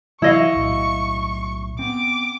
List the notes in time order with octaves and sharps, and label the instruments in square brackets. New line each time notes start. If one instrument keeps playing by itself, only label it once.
[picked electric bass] C3 E3 F#3 [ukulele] E4 D#5 F5 [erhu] C#6
[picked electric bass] B1 A2 F#3
[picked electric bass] B3 C4 [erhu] D6